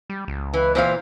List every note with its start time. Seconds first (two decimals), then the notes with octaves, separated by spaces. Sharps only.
0.10 G3
0.28 C#2
0.53 E3 B4
0.75 A#2 E3 C5 F5